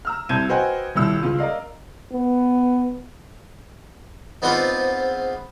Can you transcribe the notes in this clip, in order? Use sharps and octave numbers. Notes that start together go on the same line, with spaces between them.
A#5 E6 F6
C2 C4 A5 G6 G#6 D#7
F#4 B4 C5 D#5 G5 G#5
D#1 C2 E6
C#2 C#3 F4
A#4 D5 D#5 F5
B3
G#2 B3 C4 D4 F4 F#5